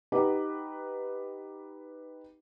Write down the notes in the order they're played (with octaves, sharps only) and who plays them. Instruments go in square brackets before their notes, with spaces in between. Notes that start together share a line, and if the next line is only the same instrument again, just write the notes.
[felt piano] D#4 G4 B4 F#5